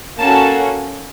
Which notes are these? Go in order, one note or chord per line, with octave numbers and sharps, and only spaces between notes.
A#3 C#4 F#4 A4 A5